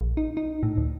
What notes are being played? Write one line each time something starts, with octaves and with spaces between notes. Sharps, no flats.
A#1
D#4
D#4
A2
D2